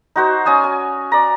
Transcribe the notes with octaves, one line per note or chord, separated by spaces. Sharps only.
D#4 F#4 C5
C#4 G#5 D#6 E6
G#5
D5 A#5